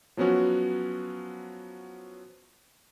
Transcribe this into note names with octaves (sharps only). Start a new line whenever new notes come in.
F3 F#3 B3 C#4 F#4